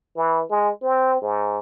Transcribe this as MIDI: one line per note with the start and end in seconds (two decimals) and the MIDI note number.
0.16 0.42 52
0.50 0.70 56
0.82 1.20 60
1.22 1.60 44